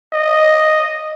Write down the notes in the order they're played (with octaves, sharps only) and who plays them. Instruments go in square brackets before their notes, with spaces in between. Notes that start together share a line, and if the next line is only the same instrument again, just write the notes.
[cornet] D#5